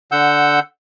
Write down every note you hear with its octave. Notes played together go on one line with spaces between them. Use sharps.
D3 F#5 E6 G6